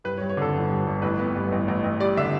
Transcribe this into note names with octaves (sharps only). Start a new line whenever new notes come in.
G2 B4
C#5
G2
C#5
D3 A4
G1
G2
G1
A1 B4
B3
G2
A1
A1
A1
G3 D5
D3 E5